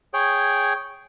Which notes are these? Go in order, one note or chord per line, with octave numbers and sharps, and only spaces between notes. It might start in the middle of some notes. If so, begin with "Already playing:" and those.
G#4 C#5 G5